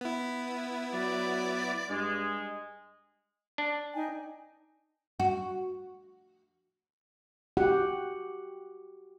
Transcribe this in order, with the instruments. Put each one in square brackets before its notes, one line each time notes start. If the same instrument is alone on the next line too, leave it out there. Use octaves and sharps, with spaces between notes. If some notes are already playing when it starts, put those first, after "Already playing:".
[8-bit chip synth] B3 E4
[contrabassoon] F#3 [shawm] D5
[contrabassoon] G2 [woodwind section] G#3
[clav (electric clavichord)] D4
[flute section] D#4 G5 G#5
[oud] F#4
[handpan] F#4 G4 F#5